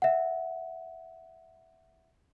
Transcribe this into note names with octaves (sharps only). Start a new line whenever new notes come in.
E5 F#5